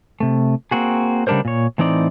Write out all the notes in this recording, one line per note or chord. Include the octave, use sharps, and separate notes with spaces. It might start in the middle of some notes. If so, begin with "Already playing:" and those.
C3 A3
A#3 C4 F#4 G#4
C#3 G3 A3 D4 A#4 C5
A#2 C#5
A2 E3 C4 D#4 D5